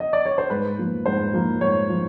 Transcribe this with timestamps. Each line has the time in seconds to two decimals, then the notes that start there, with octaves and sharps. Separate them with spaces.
0.00 D#5
0.13 D5
0.26 C#5
0.38 C5
0.50 G#2 B4
0.78 F3 A#3
1.06 G#2 C5
1.34 F3 A#3
1.61 G#2 C#5
1.89 F3